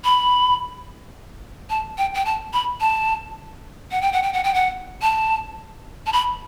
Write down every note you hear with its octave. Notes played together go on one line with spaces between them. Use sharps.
B5
A5
G5
G5
A5
B5
A5
F#5
G5
F#5
G5
F#5
G5
F#5
A5
A5
B5